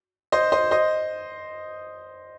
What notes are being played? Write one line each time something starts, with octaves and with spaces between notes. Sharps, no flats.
C5 D#5
C5 D#5
C5 D#5